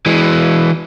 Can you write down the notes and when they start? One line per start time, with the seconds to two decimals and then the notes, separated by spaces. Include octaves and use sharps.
0.06 E3 G#3